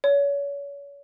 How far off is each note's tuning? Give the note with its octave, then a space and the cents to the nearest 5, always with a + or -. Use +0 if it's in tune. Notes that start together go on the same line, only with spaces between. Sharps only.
C#5 +35